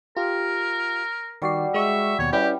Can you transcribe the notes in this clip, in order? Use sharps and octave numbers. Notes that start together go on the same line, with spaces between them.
F4 G4 A#4
D#3 G3 F#4 D5 C7
G#3 E5 C#6
D#2 B2 C#5
G3 C#4 E4 G4 B4